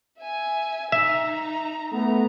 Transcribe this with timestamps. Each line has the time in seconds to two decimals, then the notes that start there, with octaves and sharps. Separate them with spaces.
0.21 E5 G#5
0.92 D#4 E5 A#5
1.92 A3 B3 A#5